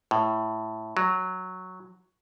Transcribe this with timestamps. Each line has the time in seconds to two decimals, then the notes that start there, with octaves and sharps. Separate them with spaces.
0.11 A2
0.97 F#3